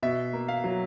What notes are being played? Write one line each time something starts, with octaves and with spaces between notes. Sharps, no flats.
B2 E5
A#3
F5
F#3